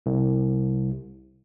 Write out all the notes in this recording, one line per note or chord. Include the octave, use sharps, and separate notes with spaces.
C2